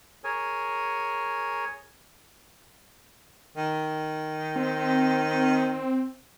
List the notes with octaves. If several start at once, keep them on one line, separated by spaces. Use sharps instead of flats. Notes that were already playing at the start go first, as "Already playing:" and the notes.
G#4 A#4 C#5 G#5
D#3
C4